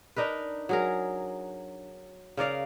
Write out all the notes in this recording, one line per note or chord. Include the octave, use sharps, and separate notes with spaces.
D4 D#4 A#4 B4
F#3 G#4 A#4
C#3 A#4 D5 F5